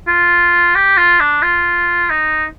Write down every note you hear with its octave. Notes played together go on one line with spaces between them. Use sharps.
F4
G4
F4
D4
F4
D#4